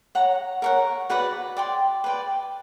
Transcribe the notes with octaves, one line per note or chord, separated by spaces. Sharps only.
C#5 F#5 A#5
A#4 C#5 F#5
F#4 B4 D5 F#5
D5 G5 C6
B4 D5 G5